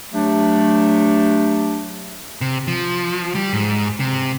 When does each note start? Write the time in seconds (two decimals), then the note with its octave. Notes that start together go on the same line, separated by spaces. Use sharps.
0.13 F#3 A3 D4 G4
2.41 C3
2.67 F3
3.35 G3
3.53 G#2
4.00 C3